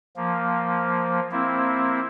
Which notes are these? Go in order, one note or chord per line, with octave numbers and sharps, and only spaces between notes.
F3 A#3
A#3 C4 E4